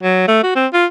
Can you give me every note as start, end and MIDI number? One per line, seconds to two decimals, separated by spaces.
0.03 0.25 54
0.28 0.39 57
0.43 0.53 66
0.56 0.67 60
0.73 0.86 65